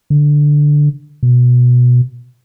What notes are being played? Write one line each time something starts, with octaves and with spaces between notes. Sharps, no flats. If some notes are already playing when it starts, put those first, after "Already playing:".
D3
B2